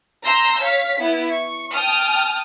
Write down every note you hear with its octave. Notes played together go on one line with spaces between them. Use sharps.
A#5 C6 E6 G6 A#6
C#5 F5 B6
B3 E4
C#6
G5 A5 D#6 F6